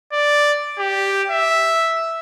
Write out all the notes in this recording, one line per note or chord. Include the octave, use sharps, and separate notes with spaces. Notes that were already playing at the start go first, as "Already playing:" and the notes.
D5
G4
E5